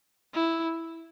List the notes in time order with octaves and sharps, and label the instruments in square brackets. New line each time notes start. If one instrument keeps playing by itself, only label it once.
[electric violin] E4